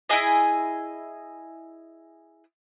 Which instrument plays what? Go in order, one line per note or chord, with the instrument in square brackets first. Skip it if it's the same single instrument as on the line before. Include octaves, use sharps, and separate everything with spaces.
[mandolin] E4 G#4 D#5